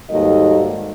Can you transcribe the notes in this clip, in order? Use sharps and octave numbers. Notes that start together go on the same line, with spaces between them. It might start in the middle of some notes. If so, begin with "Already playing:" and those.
D#2 G#2 G3 F#4 A4 D#5